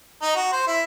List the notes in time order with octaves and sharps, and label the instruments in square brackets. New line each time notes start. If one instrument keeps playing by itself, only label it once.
[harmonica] D#4
F#4
C5
E4